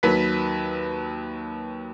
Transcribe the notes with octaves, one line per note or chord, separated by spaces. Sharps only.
D#2 F#3 B4 B6